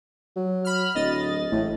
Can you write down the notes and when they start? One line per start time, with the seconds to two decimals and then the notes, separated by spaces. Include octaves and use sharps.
0.36 F#3
0.64 B5 F6
0.95 D1 D#5 A6
1.51 A1 A2